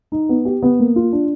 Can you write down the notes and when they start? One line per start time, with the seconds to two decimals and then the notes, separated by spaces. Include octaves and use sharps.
0.12 D#4
0.29 B3
0.45 G4
0.62 B3
0.80 A#3
0.96 F4
1.13 D4